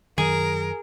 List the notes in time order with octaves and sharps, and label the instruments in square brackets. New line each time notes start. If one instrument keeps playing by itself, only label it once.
[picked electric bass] F#2 D#3 F#3 [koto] G#4 [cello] A#4